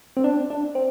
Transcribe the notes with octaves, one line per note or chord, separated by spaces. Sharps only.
C4
D4
D4
C4